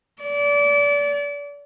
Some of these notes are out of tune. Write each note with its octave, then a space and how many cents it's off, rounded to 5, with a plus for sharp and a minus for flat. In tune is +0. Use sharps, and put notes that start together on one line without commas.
D5 -30